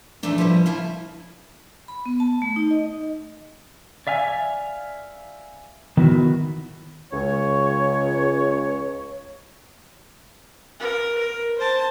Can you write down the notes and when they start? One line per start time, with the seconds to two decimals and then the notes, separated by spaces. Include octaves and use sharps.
0.23 F2 A2 E3 A3 D4 D#4
0.38 F3 G3 E4 B4 D#5
0.66 C#3 E4 F5 G#5 A5
1.88 B5
2.06 B3
2.20 A5
2.42 A3
2.56 D#4
2.71 D#5
4.07 D5 E5 F5 G#5
5.97 D#3 B3 E4 F#4
7.13 C#2 C#5
10.80 A#4
11.18 A#4
11.58 C5 A5